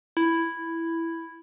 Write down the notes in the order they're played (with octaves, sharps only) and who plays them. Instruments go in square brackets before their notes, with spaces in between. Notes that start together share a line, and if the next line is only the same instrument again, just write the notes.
[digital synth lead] E4